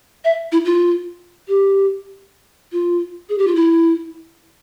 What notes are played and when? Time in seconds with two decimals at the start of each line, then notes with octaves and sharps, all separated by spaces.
0.25 E5
0.52 E4
0.65 F4
1.48 G4
2.73 F4
3.29 G#4
3.38 G4
3.47 F4
3.55 E4